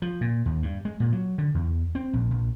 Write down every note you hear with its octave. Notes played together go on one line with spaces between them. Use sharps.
F3
A#2
D#2
G2
G#3
A#2
F#3
D3
E2
C4
A#1
A#1